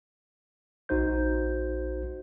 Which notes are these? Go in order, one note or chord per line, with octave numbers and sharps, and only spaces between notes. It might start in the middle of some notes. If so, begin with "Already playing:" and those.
A#1 D#4 F#4 C5 G6